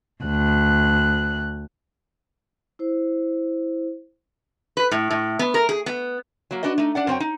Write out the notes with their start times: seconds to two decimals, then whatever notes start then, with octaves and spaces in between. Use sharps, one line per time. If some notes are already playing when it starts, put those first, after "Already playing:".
0.23 D2 F#6
2.79 E4 C5
4.77 B4
4.91 A2
5.11 A2
5.39 B3
5.54 A#4
5.69 G#4
5.86 B3
6.51 F#3 A#3
6.63 D4 F#4 B4 D#5
6.78 A3 D#4
6.95 D4 D5 F#5
7.07 F#2 C4 C#5 G5
7.20 D#4